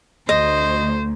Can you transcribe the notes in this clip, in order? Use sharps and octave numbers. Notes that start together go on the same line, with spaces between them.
D2 C5 D#5